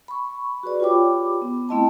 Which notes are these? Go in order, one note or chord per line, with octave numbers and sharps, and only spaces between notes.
B5 C#6
F#4 G#4 B4 D5
F4 G4 C#5 G5 B5 D6
B3
A3 C4 E4 D#5 G5 A5